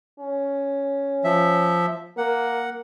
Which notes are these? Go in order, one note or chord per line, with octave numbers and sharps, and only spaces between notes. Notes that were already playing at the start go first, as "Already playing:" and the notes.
C#4
F3 E5
A#3 F#5